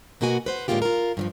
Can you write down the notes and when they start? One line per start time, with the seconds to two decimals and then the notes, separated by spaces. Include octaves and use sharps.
0.21 B2 A#3 B3 F#4 G#5
0.46 B4 C5 F#5
0.68 A2 D3 G#3 A#3 F4 G4
0.82 F4 A#4
1.17 G2 E3 F3